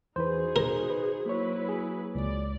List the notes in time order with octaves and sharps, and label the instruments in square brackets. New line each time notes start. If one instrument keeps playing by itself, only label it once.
[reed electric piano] E2 E3 B4 [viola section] D#4 F#4 G#4 [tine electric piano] C5
[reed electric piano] B2 [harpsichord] A#4
[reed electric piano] B4
[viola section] F#3 E4 B4 [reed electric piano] A#3 C#5
[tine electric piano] G#4
[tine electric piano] C#2 [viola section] D5